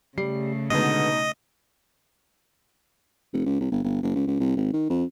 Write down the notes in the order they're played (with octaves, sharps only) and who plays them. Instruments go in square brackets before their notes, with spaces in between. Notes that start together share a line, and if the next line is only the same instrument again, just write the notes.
[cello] C#3 A3 [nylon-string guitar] G3 [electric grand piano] C7
[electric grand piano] B2 D#4 [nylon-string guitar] D3 G#3 B3 [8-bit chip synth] D#5
[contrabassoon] F1
C#2
C2
G1
G1
F#1
C#2
C#2
C2
G#1
D#3
F2